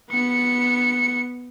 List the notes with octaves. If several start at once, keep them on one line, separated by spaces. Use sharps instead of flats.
B3 C#7